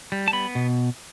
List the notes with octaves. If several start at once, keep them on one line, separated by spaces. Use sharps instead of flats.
G3
A5
B3 B5
B2